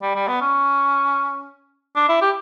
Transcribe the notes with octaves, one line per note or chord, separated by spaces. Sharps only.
G3
G3
B3
C#4
D4
E4
G4